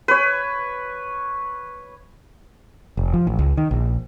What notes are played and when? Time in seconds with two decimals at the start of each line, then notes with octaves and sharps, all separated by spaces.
0.08 B4 C#5
2.97 F1
3.13 F3
3.27 A1
3.39 C#2
3.57 D#3
3.71 A#1